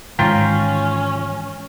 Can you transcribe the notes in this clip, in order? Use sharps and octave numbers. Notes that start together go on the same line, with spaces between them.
G#2 D#3 E3 G#3 C#4 F4 G5 A#5